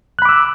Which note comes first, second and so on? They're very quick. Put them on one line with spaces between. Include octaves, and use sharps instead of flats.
F#6 B5 D6 E6